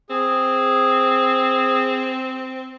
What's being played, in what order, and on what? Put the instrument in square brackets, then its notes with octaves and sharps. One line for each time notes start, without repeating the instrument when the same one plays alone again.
[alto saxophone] C4 [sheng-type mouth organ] G#4